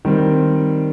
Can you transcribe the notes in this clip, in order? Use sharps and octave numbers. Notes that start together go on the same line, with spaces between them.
D#3 G3 C4